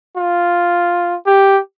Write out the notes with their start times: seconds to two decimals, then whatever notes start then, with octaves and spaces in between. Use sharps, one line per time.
0.17 F4
1.26 G4